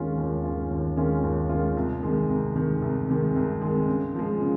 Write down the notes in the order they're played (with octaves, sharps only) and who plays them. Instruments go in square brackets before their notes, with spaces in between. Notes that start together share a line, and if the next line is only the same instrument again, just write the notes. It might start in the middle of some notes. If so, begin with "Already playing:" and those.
Already playing: [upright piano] D#2 D#3 G#3 C#4 F4
D#2
D#3 G#3 C#4 F4
D#2
D#3 G#3 C#4 F4
D#2
D#3 G#3 C#4 F4
C2
C3 D#3 G#3
C2
C3 D#3 G#3
C2
C3 D#3 G#3
C2
C3 D#3 G#3
C#3
F3 G#3
C#3